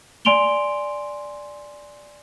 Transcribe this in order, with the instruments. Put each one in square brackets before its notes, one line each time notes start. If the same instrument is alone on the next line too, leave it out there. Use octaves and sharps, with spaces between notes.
[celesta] D5 G#5 C6 D7 F7 G7